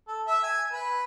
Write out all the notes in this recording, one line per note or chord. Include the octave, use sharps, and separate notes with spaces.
A4
E5
G#5
B4